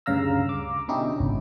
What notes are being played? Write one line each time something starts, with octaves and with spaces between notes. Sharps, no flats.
D2 G2 C#3 F5 A#5 E6
D6
B2 D3 C#4 D#4 E4 G4
G#1 C#2